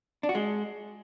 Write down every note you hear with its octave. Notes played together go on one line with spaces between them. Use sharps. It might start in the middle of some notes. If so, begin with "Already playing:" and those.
D4
F#4
G#3